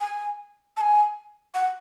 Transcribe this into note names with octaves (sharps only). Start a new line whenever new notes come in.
G#5
A5
G#5
F#5